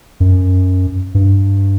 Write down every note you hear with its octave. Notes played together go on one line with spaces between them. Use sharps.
F#2
G2